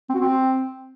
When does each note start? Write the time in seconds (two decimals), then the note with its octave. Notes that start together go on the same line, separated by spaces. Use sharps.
0.10 C4
0.15 F#4
0.20 C4